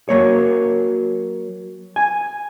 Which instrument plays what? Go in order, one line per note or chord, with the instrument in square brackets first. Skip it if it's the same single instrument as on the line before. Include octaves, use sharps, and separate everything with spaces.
[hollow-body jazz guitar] F#3 A#3 C#5
G#5